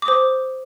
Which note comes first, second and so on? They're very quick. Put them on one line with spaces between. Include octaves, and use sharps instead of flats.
D6 D#6 C5